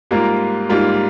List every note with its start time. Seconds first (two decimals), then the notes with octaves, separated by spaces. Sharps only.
0.11 G#2 G3 A#3 F4 A#4
0.69 G#2 G3 A#3 F4 A#4